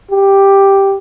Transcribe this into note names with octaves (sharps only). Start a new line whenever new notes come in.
G4